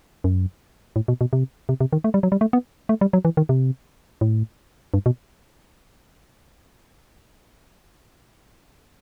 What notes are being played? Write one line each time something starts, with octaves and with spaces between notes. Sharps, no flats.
F#2
A2
B2
B2
C3
C3
C3
D#3
A3
G3
F#3
G3
A3
B3
A3
G3
F#3
E3
D#3
C3
A2
G2
B2